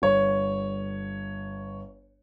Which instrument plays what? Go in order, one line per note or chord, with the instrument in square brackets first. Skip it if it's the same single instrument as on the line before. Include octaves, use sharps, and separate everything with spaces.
[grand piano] G1 C#5